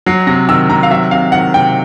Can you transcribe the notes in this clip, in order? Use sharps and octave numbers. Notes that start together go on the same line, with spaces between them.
F#3 C7
C3 A#6
D#3 E6
C3 A#5
F5
F#3 E5
C3 F5
D#3 F#5
C3 G5